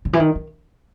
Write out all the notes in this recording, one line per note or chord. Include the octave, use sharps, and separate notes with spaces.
C#3
E3
D#3
D#3